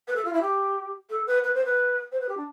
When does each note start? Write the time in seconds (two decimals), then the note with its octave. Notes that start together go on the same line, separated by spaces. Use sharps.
0.08 B4
0.16 A4
0.25 F4
0.33 E4
0.41 G4
1.10 A4
1.27 B4
1.44 B4
1.54 C5
1.65 B4
2.12 C5
2.21 B4
2.29 G4
2.37 D4